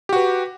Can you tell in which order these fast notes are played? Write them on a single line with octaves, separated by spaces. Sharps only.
G4 F#4 B4